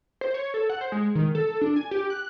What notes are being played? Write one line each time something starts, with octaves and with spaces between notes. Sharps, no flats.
C5
C#5
A4
F#5
C5
G#3
D#3
A4
D4
G#5
G4
F#6